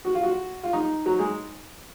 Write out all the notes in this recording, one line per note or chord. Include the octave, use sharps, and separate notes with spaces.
F#4
F4
F#4
F4
D#4
F#3
G#3